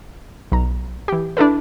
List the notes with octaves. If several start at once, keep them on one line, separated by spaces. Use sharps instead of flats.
B1 A#5
E3 G4
D4 E4 A4 B4